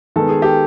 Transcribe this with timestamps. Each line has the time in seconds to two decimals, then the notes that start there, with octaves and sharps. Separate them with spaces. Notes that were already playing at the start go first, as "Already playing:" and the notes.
0.16 D#3 G#3 B3 A4
0.29 G#4
0.42 G4 A4